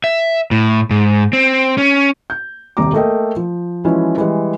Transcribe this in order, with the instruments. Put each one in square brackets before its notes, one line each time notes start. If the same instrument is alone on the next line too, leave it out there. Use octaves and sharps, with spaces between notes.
[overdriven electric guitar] E5
A2
G#2
C4
C#4
[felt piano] G6
D#1 C2 C3 A#5 D6
A3 A#3 A4 D#5 G5
F3
E3 F3 G#3 C#4 E4 F#4
E3 G3 G#3